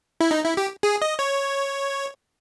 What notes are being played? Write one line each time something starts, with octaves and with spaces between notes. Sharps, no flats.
E4
D#4
E4
G4
G#4
D#5
C#5